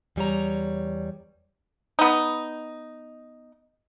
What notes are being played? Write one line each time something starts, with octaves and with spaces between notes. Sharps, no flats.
E2 G3 C#5 A#5
B3 D#4